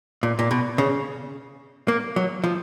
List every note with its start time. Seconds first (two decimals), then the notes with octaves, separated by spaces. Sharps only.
0.23 A#2
0.39 A#2
0.51 B2
0.78 C#3
1.88 A#3
2.16 F#3
2.44 F3